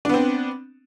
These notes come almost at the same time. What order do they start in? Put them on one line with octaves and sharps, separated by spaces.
D4 B3 C4